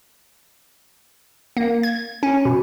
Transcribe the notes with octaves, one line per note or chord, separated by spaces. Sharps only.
A#3
G#6
C#4
B2